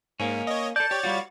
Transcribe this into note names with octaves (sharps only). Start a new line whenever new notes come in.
G#2 A#3 C#4
C#5 D#5
A4 D5 A5 G6
G4 C#5 D5 A6
G3 F4 F#4